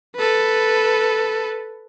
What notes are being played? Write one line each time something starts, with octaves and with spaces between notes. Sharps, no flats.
A4 B4